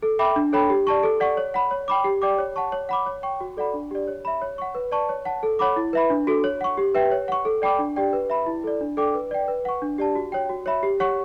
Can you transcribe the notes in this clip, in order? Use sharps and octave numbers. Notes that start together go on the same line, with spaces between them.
A4
E5 G5 B5 D6
D4
A4 C#5 G5 B5
G4
D5 A5 C#6
A4
D5 F#5 C#6
C#5
F#5 B5
C#5
G5 B5 D6
G4
D5 G5 D6
C#5
F#5 A5 C#6
C#5
F#5 B5 D6
C#5
G5 C#6
F#4
A4 D5 F#5 B5
D4
G4 D5
C#5
E5 B5
C#5
F#5 C#6
B4
D5 A5 C#6
C#5
F#5 A5
A4
C#5 F#5 B5 D6
E4
B4 E5 B5
D4
F#4 A4
C#5
F#5 C#6
G4
B4 E5 G5
C#5
F#5 C#6
A4
D5 G5 B5 D6
D4
G4 D5 G5
B4
E5 B5
E4
A4 D5
D4
A4 D5 G5 D6
B4
D5 G5
B4
F#5 C#6
D4
G4 D5 A5
F#4
C#5 G5
F#4
C#5 E5 B5
G4
C#5 F#5 C#6